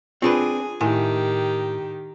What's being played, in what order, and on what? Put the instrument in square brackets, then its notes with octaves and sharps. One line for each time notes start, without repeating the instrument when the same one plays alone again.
[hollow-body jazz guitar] C4 D4 B4 [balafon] F4 [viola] G#4 G#5
[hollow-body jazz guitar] A2 [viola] D#3 G4 [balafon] E4 G#5